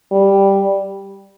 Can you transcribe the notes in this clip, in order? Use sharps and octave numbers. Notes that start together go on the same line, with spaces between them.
G3